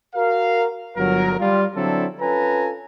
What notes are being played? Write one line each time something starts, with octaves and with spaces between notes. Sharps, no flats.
F#4 A#4 F5
G1 F#3 A#4
G3 F4
D3 F#3 C4 D4 E4 A4
C#4 F4 A4 B4 G#5 A#5